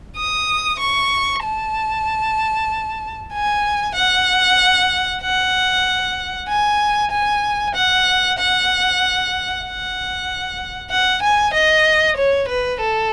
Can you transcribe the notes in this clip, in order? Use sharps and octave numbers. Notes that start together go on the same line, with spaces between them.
D#6
C#6
A5
G#5
F#5
F#5
G#5
G#5
F#5
F#5
F#5
F#5
G#5
D#5
C#5
B4
A4